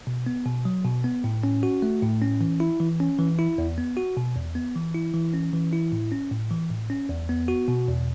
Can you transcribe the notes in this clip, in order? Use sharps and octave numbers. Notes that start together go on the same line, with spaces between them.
B2
B3
B2
F#3
B2
B3
A2
C#4
F#4
A3
A2
C#4
E3
E4
E3
C#4
E3
E4
E2
B3
F#4
B2
E2
B3
E3
E4
E3
C#4
E3
E4
A2
C#4
A2
E3
A2
C#4
E2
B3
F#4
B2
E2